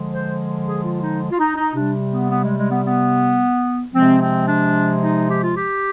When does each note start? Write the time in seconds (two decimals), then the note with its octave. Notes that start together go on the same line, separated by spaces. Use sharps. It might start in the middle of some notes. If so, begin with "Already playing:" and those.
Already playing: D3 F3 G#3
0.11 C5
0.66 G#4
0.84 F4
1.02 D#4
1.31 F4
1.39 D#4
1.56 D#4
1.75 C3 G3 D4
2.12 B3
2.30 B3
2.44 G#3
2.57 G#3
2.71 B3
2.85 B3
3.94 C3 F3 G#3 C4
4.20 C4
4.48 D4
5.02 D#4
5.29 G4
5.43 F4
5.56 G4